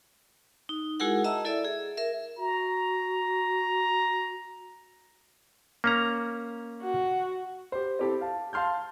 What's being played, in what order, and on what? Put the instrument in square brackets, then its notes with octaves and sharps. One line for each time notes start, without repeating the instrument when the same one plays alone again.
[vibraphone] D#4
G#3 E4 F#4 G#4 A#4 F#5
D#5 E5 A5 A#5 E6
E4 A4 D5 E5
G#4
A#4 E5
[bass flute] F#4 [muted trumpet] A#5
[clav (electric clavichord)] A#3 C#4 A#5
[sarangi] F#4
[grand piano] G4 C5
C4 E4 G4 A4
F5 A5
F5 A5 C6 F6 G6